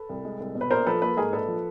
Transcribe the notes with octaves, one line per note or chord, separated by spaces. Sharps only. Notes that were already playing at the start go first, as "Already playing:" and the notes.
Already playing: A4 B4
C2
G#3
C2
B2
B4
A#1 A#4 C5
F3 A4 B4
A#3 A4 B4
G#2 G#4 A#4
A#1 A4 B4
F3